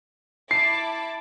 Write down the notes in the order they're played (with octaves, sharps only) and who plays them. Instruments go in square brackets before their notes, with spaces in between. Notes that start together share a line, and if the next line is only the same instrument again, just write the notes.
[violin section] E4 A5 D6 [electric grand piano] C7